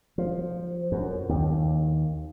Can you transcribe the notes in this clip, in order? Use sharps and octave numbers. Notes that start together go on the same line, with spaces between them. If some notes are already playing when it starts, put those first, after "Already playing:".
F3
F#2
D#2